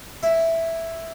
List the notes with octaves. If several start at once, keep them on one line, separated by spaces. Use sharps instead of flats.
E4